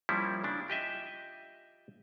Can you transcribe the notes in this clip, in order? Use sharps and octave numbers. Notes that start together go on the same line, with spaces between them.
F3 G3 A#3 C#4 E4
C#3 D4 E4
F4 G4 D#5 E5